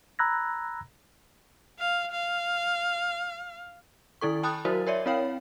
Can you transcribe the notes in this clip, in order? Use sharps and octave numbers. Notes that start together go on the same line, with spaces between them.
A#5 B5 E6 F#6 G#6 A#6
F5
F5
D#3 E4 A4 C#6
G5 A5 B5 D#6 F#6
F#3 E4 F#4 A#4 C5
A#4 C#5 D5 E5
C4 E4 C#5 F5 G5